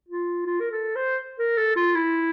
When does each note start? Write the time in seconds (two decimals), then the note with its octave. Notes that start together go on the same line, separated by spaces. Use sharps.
0.08 F4
0.46 F4
0.60 A#4
0.71 A4
0.95 C5
1.39 A#4
1.57 A4
1.76 F4
1.95 E4